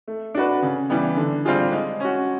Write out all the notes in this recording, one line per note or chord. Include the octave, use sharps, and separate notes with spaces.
A3
D4 F#4 B4
C#3
E3 G3 B3
D3
G3 C4 F4 G#4
G#3
C#4 F#4